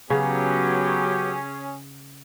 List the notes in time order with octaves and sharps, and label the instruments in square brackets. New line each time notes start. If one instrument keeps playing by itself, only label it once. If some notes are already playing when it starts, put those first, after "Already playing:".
[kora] C#3 [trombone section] F#3 B3 [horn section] C#4 G#4 [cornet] G4